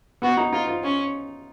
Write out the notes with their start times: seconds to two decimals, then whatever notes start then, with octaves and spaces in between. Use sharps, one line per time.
0.22 B3 F#4
0.37 D#4
0.53 D#4 F4
0.68 F4
0.84 C#4